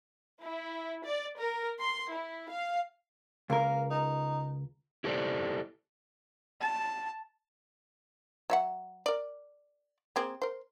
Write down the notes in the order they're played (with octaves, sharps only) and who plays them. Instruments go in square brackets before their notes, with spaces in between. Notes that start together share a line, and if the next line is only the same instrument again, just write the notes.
[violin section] E4
D5
A#4
C6
E4
F5
[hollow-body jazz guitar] C#2 A#4 [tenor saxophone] A#3
[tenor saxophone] D#4
[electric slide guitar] E4 G4 A4 C5 D5
[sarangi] A5
[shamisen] F#3 E5 F#5
A#4 D5
A#3 C4 G#4
A#4 C5